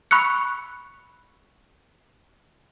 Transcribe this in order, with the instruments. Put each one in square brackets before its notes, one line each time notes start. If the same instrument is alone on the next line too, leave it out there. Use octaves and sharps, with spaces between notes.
[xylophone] B5 C#6 E6 F#6 C#7